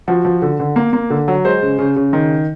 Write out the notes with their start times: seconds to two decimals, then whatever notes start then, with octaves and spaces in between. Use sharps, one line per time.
0.08 F3 F#4
0.25 F3
0.42 D3
0.60 D3
0.76 A#3
0.93 A#3
1.10 D3
1.28 F#3
1.45 G#3 C5
1.62 C#3
1.79 C#3
1.96 C#3
2.13 D#3